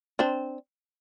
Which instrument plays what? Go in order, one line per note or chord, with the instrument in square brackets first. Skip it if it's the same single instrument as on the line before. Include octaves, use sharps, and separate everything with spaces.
[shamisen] C4 D4